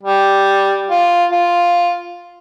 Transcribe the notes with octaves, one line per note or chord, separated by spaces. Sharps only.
G3
F4
F4